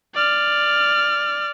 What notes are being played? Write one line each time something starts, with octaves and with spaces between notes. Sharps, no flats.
D5 F6